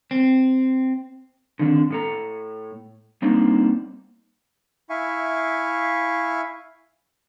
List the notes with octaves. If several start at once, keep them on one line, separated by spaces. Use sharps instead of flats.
C4
D3 D#3 C4 D4
A2 A4 A#5
G3 A#3 C4 D4 D#4
E4 E5 F5 G#5 C#6